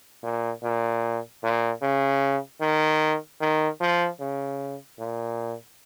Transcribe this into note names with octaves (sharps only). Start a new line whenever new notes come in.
A#2
A#2
A#2
C#3
D#3
D#3
F3
C#3
A#2